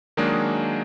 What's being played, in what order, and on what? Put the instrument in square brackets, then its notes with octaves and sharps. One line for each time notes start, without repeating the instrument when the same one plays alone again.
[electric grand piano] D#3 F#3 G#3 A#3 D4 G#4